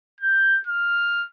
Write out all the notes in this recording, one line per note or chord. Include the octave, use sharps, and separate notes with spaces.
G6
F6